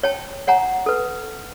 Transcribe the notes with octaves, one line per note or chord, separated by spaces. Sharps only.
C#5 G5 A5
C#5 F#5 G#5 A#5
A4 B4